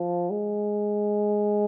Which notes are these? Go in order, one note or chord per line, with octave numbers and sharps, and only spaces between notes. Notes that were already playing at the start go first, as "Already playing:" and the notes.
Already playing: F3
G#3